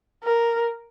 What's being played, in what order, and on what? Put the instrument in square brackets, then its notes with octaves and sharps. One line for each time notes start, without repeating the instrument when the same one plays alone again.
[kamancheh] A#4